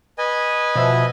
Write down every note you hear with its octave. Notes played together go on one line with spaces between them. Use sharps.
B4 D#5 G#5
B2 F3 E5